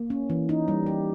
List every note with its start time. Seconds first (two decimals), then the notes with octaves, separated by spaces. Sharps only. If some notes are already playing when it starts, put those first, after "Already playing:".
Already playing: A#3
0.10 C#4
0.30 E3
0.49 D#4
0.68 G3
0.86 G4